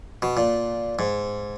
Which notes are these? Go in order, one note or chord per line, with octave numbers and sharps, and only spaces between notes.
B2
A#2
G#2